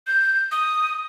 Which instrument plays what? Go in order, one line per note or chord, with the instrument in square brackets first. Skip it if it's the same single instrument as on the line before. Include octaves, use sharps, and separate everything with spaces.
[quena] G6
D#6